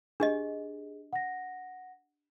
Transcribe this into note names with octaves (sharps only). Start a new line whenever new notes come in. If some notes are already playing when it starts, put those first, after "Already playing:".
D4 G4 G#4 D#5
F#5 A#6